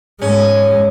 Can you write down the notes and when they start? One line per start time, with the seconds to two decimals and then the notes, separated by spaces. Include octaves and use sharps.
0.22 G#2 G#3 C#4